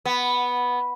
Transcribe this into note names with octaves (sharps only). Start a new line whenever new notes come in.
B3